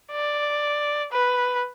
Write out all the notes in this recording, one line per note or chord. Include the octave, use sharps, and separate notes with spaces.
D5
B4